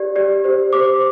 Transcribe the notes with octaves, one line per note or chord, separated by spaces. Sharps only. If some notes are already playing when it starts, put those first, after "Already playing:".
Already playing: G4 D5
G4 D5
G4 C5
G4 C5 D6